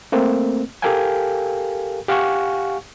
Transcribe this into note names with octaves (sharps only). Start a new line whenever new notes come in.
A3 A#3 C4
G4 A4 A#4 F5 G5 G#5
G4 F5 F#5 G#5 C#6